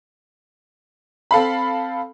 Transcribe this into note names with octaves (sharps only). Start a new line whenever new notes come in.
C4 A4 F5 B5